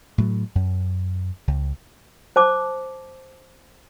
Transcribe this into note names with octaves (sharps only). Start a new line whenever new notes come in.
A2 F#3 A3
F#2
C#2
C5 A5 D6